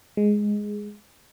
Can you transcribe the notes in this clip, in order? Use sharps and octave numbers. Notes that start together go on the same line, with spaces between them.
G#3